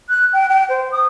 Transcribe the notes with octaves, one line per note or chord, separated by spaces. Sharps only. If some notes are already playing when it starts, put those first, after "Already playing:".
F#6
G5
G5
C5
D#6